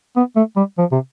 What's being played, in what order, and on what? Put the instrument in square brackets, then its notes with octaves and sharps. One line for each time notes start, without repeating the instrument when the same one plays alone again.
[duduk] B3
A3
G3
F3
C3